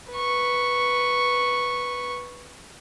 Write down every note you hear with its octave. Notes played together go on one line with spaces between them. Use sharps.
B4 C#6